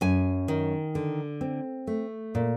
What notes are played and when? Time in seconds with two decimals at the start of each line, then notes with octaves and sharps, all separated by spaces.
0.01 F#2 G#5
0.48 D#3
0.95 D3
1.41 C4
1.87 A3
2.35 A#2